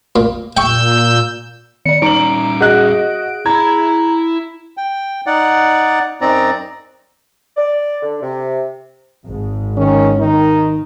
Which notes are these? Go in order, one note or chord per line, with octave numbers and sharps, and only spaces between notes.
A#2
A#2 G5 C#6 E6 G6
D#3 D5 C#7
G3 C#4 D#4 A#5 D7 F#7
F#4 G#4 D#5 F#6
E4 A#5 B5 G#6
G5
D#4 D5 F#5
F#2 C4 D#4 D5 A#5
D5
D3
C3
G#1 G#2
D#3 C#4
D#3 D#4